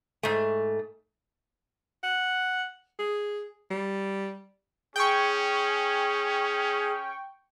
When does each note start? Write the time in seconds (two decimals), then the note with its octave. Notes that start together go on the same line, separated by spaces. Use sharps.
0.23 G#2 A3
2.03 F#5
2.99 G#4
3.70 G3
4.96 C#4 G#4 G5 C#6